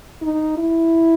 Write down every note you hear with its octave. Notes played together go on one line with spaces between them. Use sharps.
D#4
E4